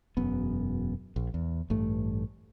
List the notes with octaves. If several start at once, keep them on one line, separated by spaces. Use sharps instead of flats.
E1 F#2 B3
A#1
E2
A1 G2 A3